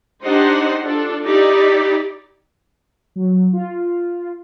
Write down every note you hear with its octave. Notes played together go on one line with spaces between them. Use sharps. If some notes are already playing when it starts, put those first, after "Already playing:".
D4 D#4 G4 C5 D#5 F#5
D4 F4 A4
D#4 E4 G4 D5
F#3
F4